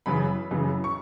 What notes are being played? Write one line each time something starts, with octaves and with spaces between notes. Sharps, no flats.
F#2 C#3 E3 B5
F#2 C#3 E3
C#6